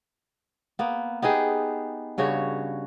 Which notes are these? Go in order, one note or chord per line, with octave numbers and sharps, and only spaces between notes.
A#3 B3
B3 D#4 G4 G#4
G2 C#3 F#4 C#5